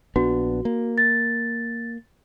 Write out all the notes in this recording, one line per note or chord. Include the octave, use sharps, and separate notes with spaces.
A#1 B3 D4 F#4
A#3
A6